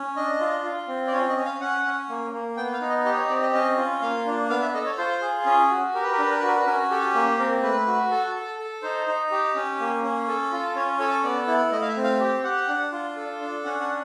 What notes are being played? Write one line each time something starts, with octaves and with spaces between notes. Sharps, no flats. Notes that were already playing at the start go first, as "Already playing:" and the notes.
Already playing: C#4
D4 D#5
F4
F4
C4
D5
C#4 C#5
D#5
C#4
F5
C#4 F#5
C#4
A#3
A#3
B3 G5
F5
D#4
D#5
G4 D#5
C#5
C4 D5
D#5
C#4 D#5
F4
A#3 F5
D4
B3 F5
E5
A4 D#5
C#5
F4 C5
G#4
C#4
F#4
G4 A#4
B4
A#4
D4 B4
A#4
F#4 B4
A#4
B4
C#4 A#4
G4 A4
A#3
C4 A#4
A3 B4
F#4
A4
A4
A4
D#4 C5
D#4
G4
C#4
A#3
C#4
A4
F4
C#4 C#5
A4 C#5
B3 D5
E4
A3 D#5
F5
E5
C4
F5
G4
G4 F#5
D4
F4
A4
D4
C#4 F#5
F#5